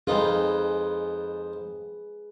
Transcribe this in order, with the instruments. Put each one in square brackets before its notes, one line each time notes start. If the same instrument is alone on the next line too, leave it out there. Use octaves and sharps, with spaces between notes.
[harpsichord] F2 D#4 F4 [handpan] G#4 B4